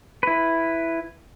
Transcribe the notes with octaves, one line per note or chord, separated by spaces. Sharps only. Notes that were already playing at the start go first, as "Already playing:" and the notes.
E4 B4